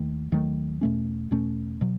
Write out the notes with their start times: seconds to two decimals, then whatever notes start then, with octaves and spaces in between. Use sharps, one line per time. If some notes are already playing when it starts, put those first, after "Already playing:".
Already playing: D#2 D#3 A3
0.32 D#2 D#3 F#3 A3
0.81 E2 B2 A3 C#4
1.31 E2 B2 A3 C#4
1.81 B2 F#3